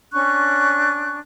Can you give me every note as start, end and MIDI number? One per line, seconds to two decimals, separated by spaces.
0.13 1.18 61
0.13 1.18 62
0.13 1.18 85
0.13 1.18 90